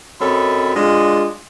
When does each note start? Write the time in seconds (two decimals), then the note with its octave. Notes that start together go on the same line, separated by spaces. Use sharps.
0.20 F#2 C4 A4 C#5 D#5 B5
0.74 G#3 D4 F4